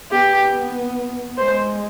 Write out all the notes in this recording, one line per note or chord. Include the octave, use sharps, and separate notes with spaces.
B3 G4
G#3 C5